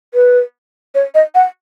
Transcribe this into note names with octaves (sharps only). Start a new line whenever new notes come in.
B4
C#5
D#5
F#5